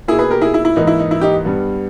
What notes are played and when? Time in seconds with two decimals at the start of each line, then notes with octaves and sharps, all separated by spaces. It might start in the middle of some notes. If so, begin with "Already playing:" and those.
0.08 B2 A#3 E4 G#4
0.19 G#4 B4
0.31 G4 A#4
0.42 E4 G#4
0.54 E4
0.65 E4
0.76 G#2 E3 A#3 D#4
0.87 E4
0.99 D#4
1.11 E4
1.21 D#4 G4
1.45 G2 G3 B3